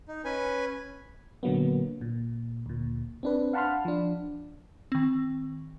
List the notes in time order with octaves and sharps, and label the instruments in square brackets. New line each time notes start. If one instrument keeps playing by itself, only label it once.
[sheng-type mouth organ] D#4
C#4 B4 G#5
[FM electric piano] A#2 D3 F#3 A#3 B3
A#2
D2 A#2
C4 D4 B4
F5 F#5 A5 B5 C6 F6
F3 D4
[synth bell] D#3 C4